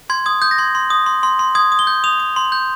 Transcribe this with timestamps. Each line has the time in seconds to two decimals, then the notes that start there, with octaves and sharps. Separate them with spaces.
0.10 C6 G#6
0.26 D#6 G#6
0.42 D#6 G6
0.51 A#6
0.58 C6 G#6
0.75 C6
0.90 D#6
1.06 C6
1.23 C6
1.39 C6
1.55 D#6 G#6
1.72 D#6
1.79 G7
1.87 G6
2.04 D#6 F7
2.20 D#6
2.36 C6
2.52 G6